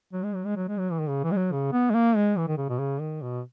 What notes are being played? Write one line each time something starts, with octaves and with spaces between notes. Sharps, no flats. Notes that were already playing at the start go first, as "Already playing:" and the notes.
F#3
G#3
F#3
G#3
F#3
G#3
F#3
E3
D#3
C#3
E3
G#3
F#3
C#3
B3
G#3
A#3
G#3
E3
D#3
C#3
B2
C#3
D#3
B2